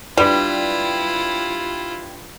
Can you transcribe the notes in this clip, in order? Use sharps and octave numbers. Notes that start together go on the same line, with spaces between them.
G3 D4 E4 F4 G4 B4